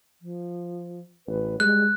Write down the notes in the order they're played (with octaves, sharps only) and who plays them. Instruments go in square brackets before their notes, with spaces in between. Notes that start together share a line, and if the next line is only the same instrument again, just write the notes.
[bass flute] F3
[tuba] A1 [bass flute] B4
[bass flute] G3 [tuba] G#3 [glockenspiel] F#6